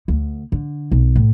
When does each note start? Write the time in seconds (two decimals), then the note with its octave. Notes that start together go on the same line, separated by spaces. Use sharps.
0.08 D2
0.52 D3
0.92 B1
1.16 A2